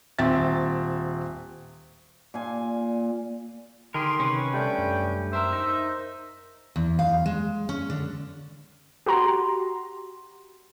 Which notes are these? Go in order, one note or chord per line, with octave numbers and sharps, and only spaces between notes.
D#1 C4 E5 A6
A#2 G#5
D3 D#3 G4 G#4 A#4 C6
C3 C#4 B4
G3 A3 D4 G5
F#2
A#4 C5 E5
D#4
E2
F5
G#3
C#4
D3
F#4 G4 A#5 C6